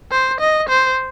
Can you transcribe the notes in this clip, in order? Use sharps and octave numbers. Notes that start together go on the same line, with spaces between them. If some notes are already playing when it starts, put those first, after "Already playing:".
C5
D#5
C5